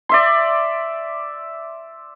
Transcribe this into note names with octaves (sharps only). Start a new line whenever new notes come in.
D5 E5 C6